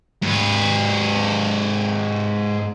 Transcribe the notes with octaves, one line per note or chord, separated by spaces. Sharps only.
G#2 B4